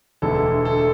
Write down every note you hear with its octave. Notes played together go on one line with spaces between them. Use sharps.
E1 D2 D3 A4
A4